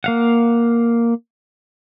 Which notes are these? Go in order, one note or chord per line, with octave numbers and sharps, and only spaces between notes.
A#3 F5 F#5